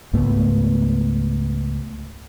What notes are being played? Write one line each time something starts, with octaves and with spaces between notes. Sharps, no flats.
C#2 G#2 A3 B3